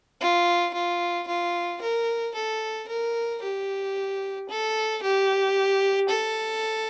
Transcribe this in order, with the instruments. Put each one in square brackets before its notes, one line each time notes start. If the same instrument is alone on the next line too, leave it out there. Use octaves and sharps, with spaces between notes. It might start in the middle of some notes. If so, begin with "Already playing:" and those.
[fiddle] F4
F4
F4
A#4
A4
A#4
G4
A4
G4
A4